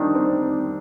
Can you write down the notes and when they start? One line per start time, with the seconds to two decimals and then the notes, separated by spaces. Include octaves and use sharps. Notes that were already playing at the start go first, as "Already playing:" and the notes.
Already playing: D#3 G3 A#3 C4 D4 D#4
0.15 C4